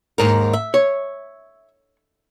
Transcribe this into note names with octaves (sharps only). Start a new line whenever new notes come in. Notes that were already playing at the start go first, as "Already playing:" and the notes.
D#2 G#2 A#4
E5
C#5